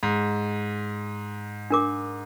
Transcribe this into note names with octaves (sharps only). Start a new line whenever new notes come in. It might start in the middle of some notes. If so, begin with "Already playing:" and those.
G#2
D4 A#4 D6